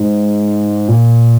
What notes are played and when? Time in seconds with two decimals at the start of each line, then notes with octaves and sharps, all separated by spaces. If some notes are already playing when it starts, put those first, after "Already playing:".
Already playing: G#2
0.88 A#2